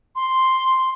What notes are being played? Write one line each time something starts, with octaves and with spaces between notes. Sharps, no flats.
C6